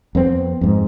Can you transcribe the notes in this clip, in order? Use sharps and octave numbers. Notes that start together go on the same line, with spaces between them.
F2 B3 C4
F2 G#2